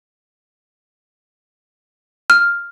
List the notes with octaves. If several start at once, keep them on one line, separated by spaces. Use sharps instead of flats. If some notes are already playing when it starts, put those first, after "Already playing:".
F6